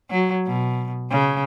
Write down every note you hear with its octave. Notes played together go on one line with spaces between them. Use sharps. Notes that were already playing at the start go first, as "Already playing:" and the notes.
F#3
B2
C#3